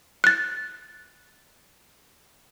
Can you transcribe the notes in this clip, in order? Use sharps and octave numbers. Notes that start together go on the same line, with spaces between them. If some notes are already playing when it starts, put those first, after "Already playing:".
F#6 A6